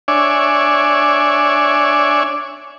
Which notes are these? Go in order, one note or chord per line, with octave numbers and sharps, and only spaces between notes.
D4 C#5 D5 E5 G#5